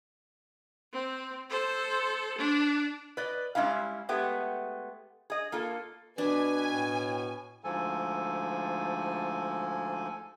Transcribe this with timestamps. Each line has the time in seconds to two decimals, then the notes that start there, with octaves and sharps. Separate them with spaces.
0.92 C4
1.50 A4 C5
2.38 D4
3.17 B4 D5 D#5
3.55 G3 G#3 C#4 E4 F5
4.09 G#3 A3 B3 G4
5.30 G#4 D#5
5.52 A#3 F4 A4
6.18 B2 D4 B4 G#5
6.73 A2
7.64 D2 G#2 F3 A4 G#5